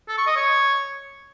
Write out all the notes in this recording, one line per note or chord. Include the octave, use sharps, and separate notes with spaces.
A4
C#6
D#5
C#5